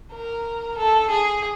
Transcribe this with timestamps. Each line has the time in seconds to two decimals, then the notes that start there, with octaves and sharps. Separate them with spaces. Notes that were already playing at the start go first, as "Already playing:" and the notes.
0.12 A#4
0.78 A4
1.10 G#4